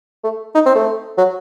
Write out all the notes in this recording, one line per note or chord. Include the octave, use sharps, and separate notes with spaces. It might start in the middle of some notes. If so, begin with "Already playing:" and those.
A3
D#4
C4
A3
F#3